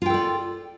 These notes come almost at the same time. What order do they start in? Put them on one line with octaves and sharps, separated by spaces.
F4 G5 A4 D5